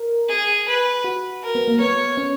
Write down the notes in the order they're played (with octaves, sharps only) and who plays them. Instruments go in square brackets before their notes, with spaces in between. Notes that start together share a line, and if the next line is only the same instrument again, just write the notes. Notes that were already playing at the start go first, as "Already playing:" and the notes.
Already playing: [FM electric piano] A#4
[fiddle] G#4
B4
[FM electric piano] F#4
[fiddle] A#4
[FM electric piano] B3
A#3
[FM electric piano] B3 [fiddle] C#5
[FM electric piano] C#4